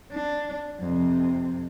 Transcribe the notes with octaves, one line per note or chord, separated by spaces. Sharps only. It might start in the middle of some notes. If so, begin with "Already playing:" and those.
D4
F2 C3